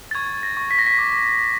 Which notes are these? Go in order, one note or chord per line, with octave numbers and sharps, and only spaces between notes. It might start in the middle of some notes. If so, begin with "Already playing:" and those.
A6
C#6 G#6
A#6
C#6
B6
A#6
B6
D6